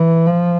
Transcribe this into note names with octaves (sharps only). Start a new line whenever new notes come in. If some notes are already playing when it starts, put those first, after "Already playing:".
Already playing: E3
F3